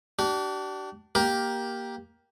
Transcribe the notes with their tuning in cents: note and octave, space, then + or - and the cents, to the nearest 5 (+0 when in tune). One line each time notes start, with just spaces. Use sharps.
D4 +0 G4 -40
A#3 +10 G4 +0 A#4 +15